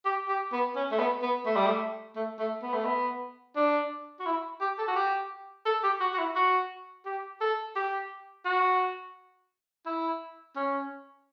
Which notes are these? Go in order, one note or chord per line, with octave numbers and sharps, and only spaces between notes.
G4
G4
B3
C#4
A3
B3
B3
A3
G3
A3
A3
A3
B3
A3
B3
D4
F#4
E4
G4
A4
F#4
G4
A4
G4
F#4
F#4
E4
F#4
G4
A4
G4
F#4
E4
C#4